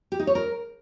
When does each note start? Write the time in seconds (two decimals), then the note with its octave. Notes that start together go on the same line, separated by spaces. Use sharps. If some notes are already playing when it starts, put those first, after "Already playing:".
0.12 G4
0.20 D#4
0.27 C#5
0.35 A#4